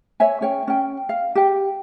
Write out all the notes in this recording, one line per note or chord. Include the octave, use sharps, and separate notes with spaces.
C#5 E5 G#5
C#4 C#5 G5
C#4 G5
F5
G4 G5